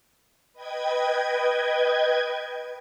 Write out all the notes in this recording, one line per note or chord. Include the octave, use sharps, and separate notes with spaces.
B4 D#5 G5 G#6